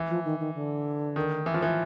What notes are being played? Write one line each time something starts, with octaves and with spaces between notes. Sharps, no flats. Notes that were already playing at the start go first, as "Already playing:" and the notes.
Already playing: E3
F3
D#3
D#3
D3
D#3
E3
F3
E3